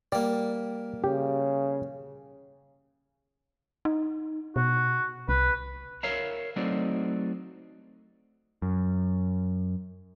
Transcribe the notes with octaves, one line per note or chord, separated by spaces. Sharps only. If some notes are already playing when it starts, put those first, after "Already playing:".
G3 A#3 D5
C#3 G4
D#4
B2 F#4
C2 B4
A#4 C#5 E5 F5 A#5
F#3 A3 C4 D#4 F#4 D5
F#2